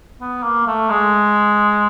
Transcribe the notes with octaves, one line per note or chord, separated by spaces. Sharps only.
B3
A#3
A3
G#3